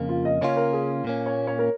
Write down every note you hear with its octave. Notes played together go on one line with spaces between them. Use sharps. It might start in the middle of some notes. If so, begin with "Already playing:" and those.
Already playing: F2 C#3 A#3
F4
D#5
C#3 A#3 C#4 F4 C#5
A#4
G#4
A#2 A#3 C#4
C#5
C#5
A#4